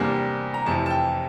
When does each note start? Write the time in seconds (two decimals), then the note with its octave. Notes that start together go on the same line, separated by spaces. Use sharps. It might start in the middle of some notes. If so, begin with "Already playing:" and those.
Already playing: E2 C3 G3 A#3 D4
0.54 A#5
0.66 F1 F2 C3 E3 A5
0.86 A5
0.90 G5